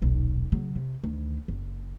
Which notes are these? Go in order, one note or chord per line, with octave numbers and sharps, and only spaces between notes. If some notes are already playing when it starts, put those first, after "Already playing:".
D#1 B1
C#3 F#3
C3
D2 D#3
F#1